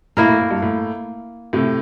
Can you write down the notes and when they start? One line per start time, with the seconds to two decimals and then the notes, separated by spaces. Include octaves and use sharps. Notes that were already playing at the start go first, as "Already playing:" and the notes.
0.17 A2 A#3 E4 A#4
0.29 A2
0.40 A2
0.51 G2
0.62 A2
1.53 A2 C3